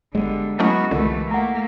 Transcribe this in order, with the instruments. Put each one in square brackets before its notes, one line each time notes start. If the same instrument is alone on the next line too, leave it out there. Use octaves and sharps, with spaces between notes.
[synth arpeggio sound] G1 [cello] D3 G3 [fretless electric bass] G#3
[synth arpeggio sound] F#3 A3 C#4 [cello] B3 F#4 [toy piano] E4 A4 D#5
[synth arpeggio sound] C2 D3 [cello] E3 A3 [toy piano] F4 A#4
[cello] A3 A#3 [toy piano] F#5 A#5